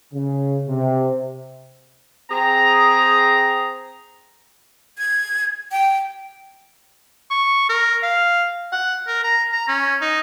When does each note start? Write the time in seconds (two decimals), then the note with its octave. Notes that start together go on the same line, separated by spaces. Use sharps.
0.14 C#3
0.69 C3
2.30 C4 G#4 A#5
4.98 G#6
5.72 G5
7.30 C#6
7.69 A#4
8.03 F5
8.72 F#5
9.07 A#4
9.24 A#5
9.52 A#5
9.68 C#4
10.01 D#4